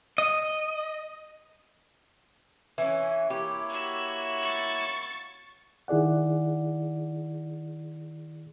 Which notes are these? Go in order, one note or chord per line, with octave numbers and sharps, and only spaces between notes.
D#5
E3 C#4
A#3 E4 G4 C#5
F#4 E5
C#6 A6
D#3 E4 G#4 D5 F#5